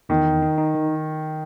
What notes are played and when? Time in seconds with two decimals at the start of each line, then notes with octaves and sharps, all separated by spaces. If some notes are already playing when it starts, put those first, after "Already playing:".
0.09 E2 D#3
0.26 D#4
0.42 D#4
0.58 D#4
0.75 D#3